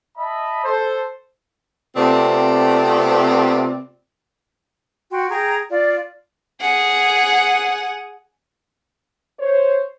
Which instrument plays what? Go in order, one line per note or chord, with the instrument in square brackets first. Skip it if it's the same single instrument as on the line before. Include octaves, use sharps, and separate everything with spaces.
[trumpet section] D#5 E5 A5 B5
A4 C5
[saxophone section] C3 A3 B3 C4 F4 D5
[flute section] F#4 F#5 G5 C6
G#4 G5 A#5
F4 D5
[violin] G#4 F#5
[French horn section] C5 C#5